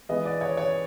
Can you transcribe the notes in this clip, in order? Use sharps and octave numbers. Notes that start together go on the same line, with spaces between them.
E3 G#3 B3 D#5
D5
C#5
C#5